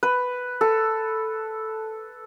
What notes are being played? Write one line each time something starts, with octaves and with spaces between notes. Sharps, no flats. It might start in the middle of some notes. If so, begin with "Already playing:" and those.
B4
A4